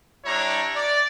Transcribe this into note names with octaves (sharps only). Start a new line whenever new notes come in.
G3 D4 E4 C#5 A#5
D5